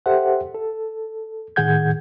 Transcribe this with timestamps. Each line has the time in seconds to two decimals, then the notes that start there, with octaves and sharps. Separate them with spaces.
0.06 G4 A4 C5 E5 F#5
0.55 A4
1.56 A2 D#3 G#4 F#5 G6 G#6